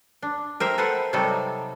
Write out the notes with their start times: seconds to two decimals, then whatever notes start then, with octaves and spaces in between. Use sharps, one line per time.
0.22 D4
0.60 A#4 C5 E5 G5
0.78 A4 B4 C5 F#5
1.13 C3 F#3 G3 D#4 A4